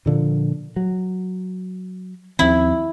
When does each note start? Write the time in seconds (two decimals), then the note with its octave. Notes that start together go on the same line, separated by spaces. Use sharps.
0.06 A#2 D3 F3
0.76 F#3
2.39 D#2 F3 C4 E4